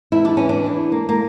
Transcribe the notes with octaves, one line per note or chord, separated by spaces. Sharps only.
E2 E4
D4
E3 C#4
D4
E2
A#3
A#3